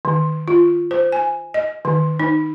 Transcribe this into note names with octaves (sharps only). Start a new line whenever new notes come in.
D#3
F4
C5
G#5
D#5
D#3
D#4